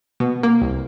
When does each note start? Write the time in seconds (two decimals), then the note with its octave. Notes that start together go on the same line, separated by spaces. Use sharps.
0.20 B2
0.43 A#3
0.62 C2